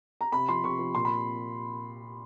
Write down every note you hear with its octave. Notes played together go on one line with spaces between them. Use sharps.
A#5
C3 B5
F3 C6
C3 C#6
F3
A#2 C6
B5